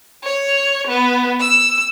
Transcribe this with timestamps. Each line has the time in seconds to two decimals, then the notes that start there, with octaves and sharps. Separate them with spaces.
0.24 C#5
0.87 B3
1.40 E6